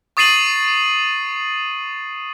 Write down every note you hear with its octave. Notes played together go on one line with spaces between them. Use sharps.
C#6 D#6 A6 C7 D#7 F#7